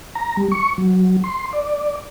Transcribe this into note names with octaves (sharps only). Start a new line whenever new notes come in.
A#5
G3
C#6
F#3
C6
D5